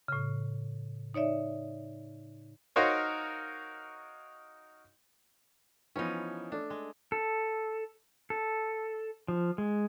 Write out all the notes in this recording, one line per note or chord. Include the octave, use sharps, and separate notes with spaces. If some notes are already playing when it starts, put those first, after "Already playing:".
A2 C#3
D#4 C#5 D5 E5
D#4 F#4 A#4 C5 C#5 F5
E3 F3 B3 C#4 D#4
A3 D4
G#3
A4
A4
F3
G#3